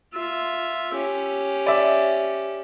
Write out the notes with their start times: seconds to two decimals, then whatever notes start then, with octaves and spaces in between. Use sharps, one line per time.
0.14 F4 E5
0.95 C#4 G4
1.67 D5 E5